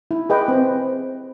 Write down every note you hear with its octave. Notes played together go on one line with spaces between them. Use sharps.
E4
G#4 B4 D#5 G5
C4